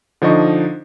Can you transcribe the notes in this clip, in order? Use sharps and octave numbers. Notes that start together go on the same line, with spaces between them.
D3 F3 D#4 D#5 C#6